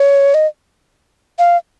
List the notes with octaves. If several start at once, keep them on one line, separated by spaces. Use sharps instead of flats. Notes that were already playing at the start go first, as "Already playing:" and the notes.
Already playing: C#5
D#5
F5